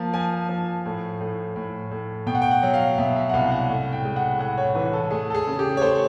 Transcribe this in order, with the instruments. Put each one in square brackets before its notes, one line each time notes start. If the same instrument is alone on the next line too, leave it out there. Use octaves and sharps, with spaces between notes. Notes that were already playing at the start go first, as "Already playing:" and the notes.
Already playing: [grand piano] F3 A#3 A5
F3 G#5
F3
A2
A2
A2
A2
B2 G5
F#5
G5
F#5
F#3
F5
B2 E5
E5
F#5
C2 F5
F#5
A2
G5
G#3
F#5
A2 F#5
C#5
E3 B4
A4
A3 G#4
A4
G#4
C#3
G4
C#5
A3 C5